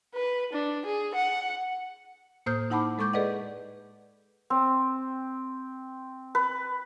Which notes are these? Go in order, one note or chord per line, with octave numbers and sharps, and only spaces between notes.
B4
D4
G#4
F#5
A2 A#3 C5 D#6 F6 G6
D#4 E4 F#5 A5 B5 D6
G#3 A4 C#6 D6 G6
G#4 A4 B4 D5 D#5 F#5
C4
B4